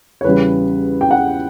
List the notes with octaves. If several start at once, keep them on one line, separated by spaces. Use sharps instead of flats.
C#5
E2 C#3 G3 B4
G5
F#5